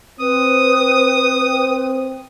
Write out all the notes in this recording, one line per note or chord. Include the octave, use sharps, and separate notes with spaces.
C4 B4 D#6